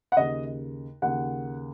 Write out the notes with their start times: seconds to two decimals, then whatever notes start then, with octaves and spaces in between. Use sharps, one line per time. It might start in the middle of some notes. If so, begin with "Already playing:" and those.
0.12 F#5
0.16 D#2 C#3 D#5
1.02 D#2 C#3 F#5